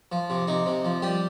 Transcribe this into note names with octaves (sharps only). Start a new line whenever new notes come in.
F3
C3
C3 D#4
C3
F3
G3 G4